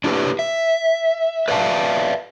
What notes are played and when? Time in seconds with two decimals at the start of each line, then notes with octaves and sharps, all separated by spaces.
0.04 D4 E4 G4 B4
0.39 E5
1.48 B4 D5 E5 F5 A5